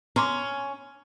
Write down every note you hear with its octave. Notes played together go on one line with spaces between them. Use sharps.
C#4 A#5 C6 D6